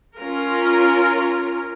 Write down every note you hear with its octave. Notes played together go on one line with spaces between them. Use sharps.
C#4 F4 A#4